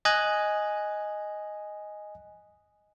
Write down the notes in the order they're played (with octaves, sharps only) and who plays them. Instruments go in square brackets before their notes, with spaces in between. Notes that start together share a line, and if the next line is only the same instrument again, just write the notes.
[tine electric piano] D#5 G#5 F#6